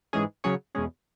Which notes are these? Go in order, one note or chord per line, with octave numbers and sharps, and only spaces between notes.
G#2 E3 G#3 C#4 G#4
C#3 F#3 C#4 G#4 C#5
E2 B2 G#3 C#4 G#4